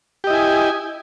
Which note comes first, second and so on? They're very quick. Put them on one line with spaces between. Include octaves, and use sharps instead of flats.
G4 D#5 E4 G#5